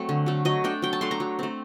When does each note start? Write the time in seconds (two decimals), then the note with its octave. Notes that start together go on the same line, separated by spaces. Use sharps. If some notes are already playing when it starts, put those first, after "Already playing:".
Already playing: F#3 A3 C4
0.09 D3
0.26 F#3 A3
0.45 F#3 D#5
0.64 A3 D4 G5
0.82 F#3 G5
0.93 A5
1.01 A3 D4 C6
1.11 A#5
1.20 F#3
1.39 A3 C4